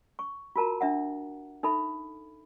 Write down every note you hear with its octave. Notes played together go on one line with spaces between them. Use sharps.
C#6
F4 F#4 A#4 A5 A#5
D4 E5 F#5
D#4 A4 E5 B5